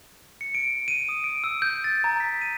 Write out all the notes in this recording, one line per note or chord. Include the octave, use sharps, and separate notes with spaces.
C#7
D7
D#7
D#6
D7
E6
G6
A6
A#5
B6
D#7